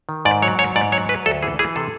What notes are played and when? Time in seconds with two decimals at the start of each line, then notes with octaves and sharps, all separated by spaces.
0.09 D#3
0.25 G#2 D5
0.42 F#3 C#5
0.59 G#2 C#5
0.76 G#2 D5
0.92 F#3 C#5
1.09 F#3 B4
1.26 D2 A4
1.43 E3 G#4
1.59 E3 G#4
1.76 C3 A4